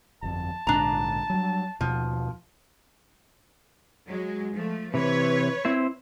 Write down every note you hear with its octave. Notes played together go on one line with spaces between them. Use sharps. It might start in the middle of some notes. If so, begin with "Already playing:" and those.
G1 F2 A5
A#1 G#2 D3 D4 A#5
F#3 G3
D#2 B2 F3
F#3 G#3
F3 A3
C3 E3 B4 C#5
C4 E4 C5